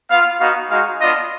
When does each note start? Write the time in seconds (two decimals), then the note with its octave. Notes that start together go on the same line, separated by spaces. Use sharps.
0.10 B3 F4 F5
0.40 B3 D#4 F#4 F5
0.70 G#3 D#4 F#4 F5
1.01 B3 D4 F4 D#5